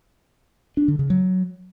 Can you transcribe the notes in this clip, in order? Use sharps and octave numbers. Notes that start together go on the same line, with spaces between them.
D4
D3
C#3
F#3